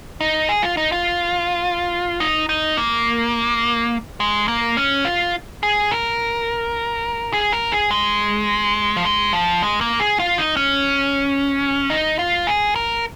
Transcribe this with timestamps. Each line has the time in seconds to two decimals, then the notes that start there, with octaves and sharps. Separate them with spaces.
0.21 D#4
0.49 G#4
0.62 F4
0.77 D#4
0.92 F4
2.20 D#4
2.49 D#4
2.77 A#3
4.20 G#3
4.48 A#3
4.77 C#4
5.05 F4
5.63 G#4
5.91 A#4
7.33 G#4
7.53 A#4
7.72 G#4
7.91 G#3
8.97 F3
9.05 G#3
9.33 F3
9.63 G#3
9.81 A#3
10.00 G#4
10.19 F4
10.38 D#4
10.57 C#4
11.90 D#4
12.19 F4
12.47 G#4
12.76 A#4